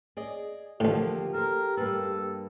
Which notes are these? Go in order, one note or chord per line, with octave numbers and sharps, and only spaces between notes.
G#4 D5 D#5
A1 A2 D3 F3 A#3 G4
A4 A#4 C5
G2 A#3 A4 B4